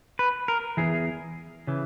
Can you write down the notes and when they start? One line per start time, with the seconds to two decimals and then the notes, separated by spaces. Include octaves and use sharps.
0.19 B4
0.48 A#4
0.77 E2 C#3 E3 G#4
1.67 C#3 E3